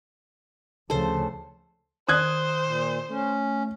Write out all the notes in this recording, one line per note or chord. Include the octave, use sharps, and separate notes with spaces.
D2 C#3 F3 A4 C5
D#3 C5 D#6 F#6 G#6
A#2
A3 C#4